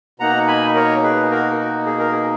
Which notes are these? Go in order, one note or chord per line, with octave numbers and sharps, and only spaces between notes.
B2 A#3 D#4 F#5 A#5
G#5 B5
A#4 C#5
G#4 B4
F#4 A#4
F#4
G#4
A#4
G#4